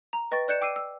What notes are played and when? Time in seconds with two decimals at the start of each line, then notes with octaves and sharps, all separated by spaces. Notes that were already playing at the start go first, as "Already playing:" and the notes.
0.13 A#5
0.31 B4 D#5 G5 C#6 A6
0.48 D5 F#6 G6 C#7 E7
0.61 G5 D6 E6 C7 D#7
0.76 E6